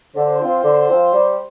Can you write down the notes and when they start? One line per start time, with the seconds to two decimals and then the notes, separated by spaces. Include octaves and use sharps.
0.15 D3 C5
0.40 F3 C4 F4
0.63 D3
0.88 F3 C4 F4
1.13 G3